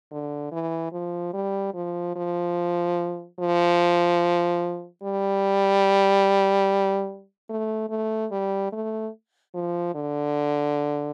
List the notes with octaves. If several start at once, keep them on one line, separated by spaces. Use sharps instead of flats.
D3
E3
F3
G3
F3
F3
F3
G3
A3
A3
G3
A3
F3
D3